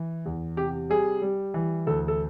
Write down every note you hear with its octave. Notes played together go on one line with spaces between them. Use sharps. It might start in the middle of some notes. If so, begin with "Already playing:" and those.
Already playing: E3
E2
C3 G4
G3 G#4
G3
E3
D2 A4
A4